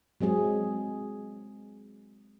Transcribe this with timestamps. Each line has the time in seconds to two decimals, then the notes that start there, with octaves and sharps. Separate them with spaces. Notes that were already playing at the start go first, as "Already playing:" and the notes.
0.21 F#3 G#3 C4 G#4